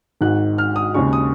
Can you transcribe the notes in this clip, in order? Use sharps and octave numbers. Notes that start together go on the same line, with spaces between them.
G#1 G#2 D#3 F#6
F6
D#6
D#2 C#3 G#3 C#6
D#6